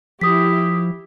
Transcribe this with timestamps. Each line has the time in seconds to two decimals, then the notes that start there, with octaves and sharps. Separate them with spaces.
0.21 F3 E4 G4 D#6 B6